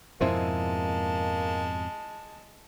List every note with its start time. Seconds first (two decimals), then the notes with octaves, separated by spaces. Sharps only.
0.21 F2 G#2 B2 G#3 A#3 C4 E4 A5